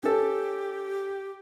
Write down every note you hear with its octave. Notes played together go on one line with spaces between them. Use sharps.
C#4 G4 A4